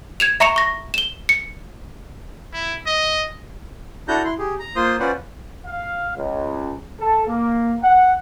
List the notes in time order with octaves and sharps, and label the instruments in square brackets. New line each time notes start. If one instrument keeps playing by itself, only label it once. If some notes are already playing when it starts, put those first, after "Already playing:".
[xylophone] G#6 E7 F7
E5 A#5 C#6 C#7 E7 F7
C#6 A#6
E7 G7
C#7
[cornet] E4
D#5
[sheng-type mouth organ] D4 E4 F#4 A4 A#5 G6
E4 C6
G4 G#4
A#5
A#3 F4 C5 C6 D#6
C#4 F4 B4 C5 D5 F#5
[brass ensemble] F5
C#2
A4
A#3
F#5